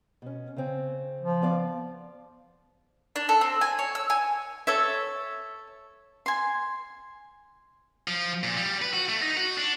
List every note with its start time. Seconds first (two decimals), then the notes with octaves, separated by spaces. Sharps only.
0.22 B2 C#4
0.57 C#3 C4
1.21 F3
1.42 B3 D5 F5
3.16 D4
3.29 A4
3.41 C4
3.61 G#5
3.79 C#5
3.95 E6
4.10 G#5
4.67 A4 C#5 E5
6.26 G#5 C6
8.08 F3
8.43 A#2
8.57 G3
8.82 B4
8.93 F#4
9.09 A3
9.22 D#4
9.37 F#4
9.57 D4